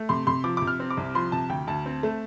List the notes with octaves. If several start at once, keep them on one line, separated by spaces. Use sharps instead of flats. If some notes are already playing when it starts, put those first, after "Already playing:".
Already playing: A3
C3 C6
C3 C6
F3 D6
C3 D6
F6
C4
D6
C2
F3 C6
C3 A5
D2 G5
D2 A5
C4
A3